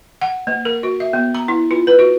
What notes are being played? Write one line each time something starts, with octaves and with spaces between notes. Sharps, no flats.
F#5
A#3
A#4
F#4
E5
B3
A#5
E4
F4
B4
F#4